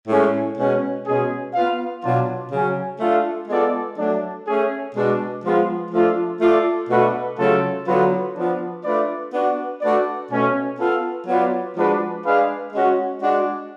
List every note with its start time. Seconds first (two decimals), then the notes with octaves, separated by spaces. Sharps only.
0.08 A2 G#3 C#4
0.57 B2 G#3 C#4
1.06 B2 G#3 C#4 G#4
1.54 B3 F4 B4 F5
2.03 B2 F#3 B3 D4 F4
2.52 C#3 F#3 C#4
3.00 A3 D4 F4 A4 F5
3.49 G#3 B3 F4 A4 D5
3.98 F#3 A3 D4
4.46 A3 C#4 G#4
4.95 B2 G#3 D4
5.44 F3 G#3 B3 F4
5.92 F3 A3 D4 F4
6.41 A3 F4 A4 D5
6.89 B2 A3 D4 F#4 B4
7.38 C#3 F#3 A3 F4 A4
7.87 D3 F#3 B3 F4 B4
8.35 F3 B3 D4
8.84 A3 D4 F4 B4 D5
9.33 B3 D4 F#4
9.81 A3 D4 F#4 B4 D5
10.30 B2 A3 C#4
10.79 B3 F4 A4 F5
11.27 F#3 B3 F4 B4 D5
11.76 F3 G#3 D4 F#4 B4
12.24 G#3 D4 G#4 B4 F5
12.73 G#3 C#4 F#4
13.22 G#3 D4 F#4